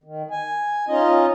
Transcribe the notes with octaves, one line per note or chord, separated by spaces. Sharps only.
D#3
G#5
C#4 D#4 F4 D#5